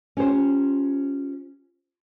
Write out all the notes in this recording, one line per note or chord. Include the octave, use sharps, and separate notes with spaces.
C#4 F4 G4 C5